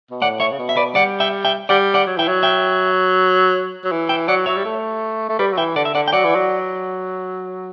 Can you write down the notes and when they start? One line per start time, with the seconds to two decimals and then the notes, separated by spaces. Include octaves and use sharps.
0.11 B2
0.22 A2 D5 F#5
0.40 C#5 E5
0.51 C#3
0.59 B2
0.69 E5
0.77 B4 D5
0.95 G3 D5 F#5
1.20 E5 G5
1.45 E5 G5
1.69 G3 D5 F#5
1.94 D5 F#5
2.07 F#3
2.17 E3 E5 G5
2.28 F#3
2.43 E5 G5
3.84 F#3
3.91 E3
4.09 E5 G5
4.28 F#3 D5 F#5
4.46 F#3 C#5 E5
4.56 G3
4.65 A3
5.29 A3
5.39 G3 B4 D5
5.52 F#3
5.57 E3 E5 G5
5.76 D3 D5 F#5
5.85 E5
5.94 D3 D5 F#5
6.08 G5
6.13 F#3 D5 F#5
6.24 E3
6.35 F#3